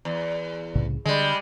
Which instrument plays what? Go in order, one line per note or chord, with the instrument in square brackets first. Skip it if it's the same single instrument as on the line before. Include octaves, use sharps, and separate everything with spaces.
[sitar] E2
[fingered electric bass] C2 A2 C#3
[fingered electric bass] D3 [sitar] G3 G#3